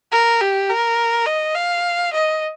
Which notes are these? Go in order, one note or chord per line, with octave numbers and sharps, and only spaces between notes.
A#4
G4
A#4
D#5
F5
D#5